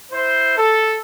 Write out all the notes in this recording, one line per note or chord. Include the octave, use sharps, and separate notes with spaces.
E4 C5
A4